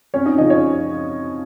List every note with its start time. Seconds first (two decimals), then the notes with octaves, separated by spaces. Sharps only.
0.14 F2 C#4 C#5
0.26 D#4 D#5
0.38 C#3 F3 C#4 D#4 D#5
0.50 C#4 C#5